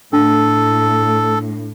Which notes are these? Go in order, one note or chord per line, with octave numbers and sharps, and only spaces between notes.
A2 D4 A4